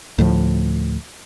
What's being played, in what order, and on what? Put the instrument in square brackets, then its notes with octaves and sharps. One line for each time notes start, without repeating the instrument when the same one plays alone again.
[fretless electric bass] D2 A2 F3